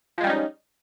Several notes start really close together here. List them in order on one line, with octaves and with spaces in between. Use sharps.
F3 G#3 G3 C#4 D#4